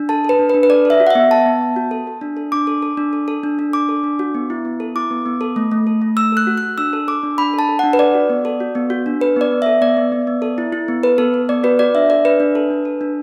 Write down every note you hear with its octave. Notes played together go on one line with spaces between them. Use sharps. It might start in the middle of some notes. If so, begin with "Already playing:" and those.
Already playing: D4
A4 A5
A4 B4
D4
B4
D4
B4
A4 D5
A4 E5
F#4
F#5
B3 E5
B3 A5
B3
B3
F#4
A4
A4
D4
A4
D4 D6
A4
A4
D4
A4
A4
D4
D4
D4 D6
A4
D4
F#4
B3
E4
B3
A4
E4 D6
B3
B3
A4
A3
A3
A4
A3
A3 E6
A4 F#6
F#4
F#4 F#6
D4 E6
A4
A4 D6
D4
D4 B5
A4
A5
A4
D4 F#5
B4
A4 D5
F#4
B3
A4
F#4
B3
F#4
D4
A4 B4
B3 D5
B3
A4 E5
B3 D5
B3
B3
B3
A4
E4
E4
B3
A4 B4
B3 A4
A4
B3 D5
F#4 B4
F#4 D5
D4 E5
A4 D5
D4 B4
D4
A4
D4
A4
D4